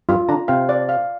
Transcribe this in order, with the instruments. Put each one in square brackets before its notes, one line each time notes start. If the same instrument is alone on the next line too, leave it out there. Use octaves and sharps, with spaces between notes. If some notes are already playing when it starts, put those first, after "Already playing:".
[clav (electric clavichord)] G2 G3 [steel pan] F4
[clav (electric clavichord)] D3 D4 [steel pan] A#5
[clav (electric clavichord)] C3 C4 [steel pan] F5
[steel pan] D5
F5